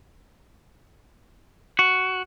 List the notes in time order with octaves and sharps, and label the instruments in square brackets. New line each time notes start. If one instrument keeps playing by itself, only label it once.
[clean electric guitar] F#4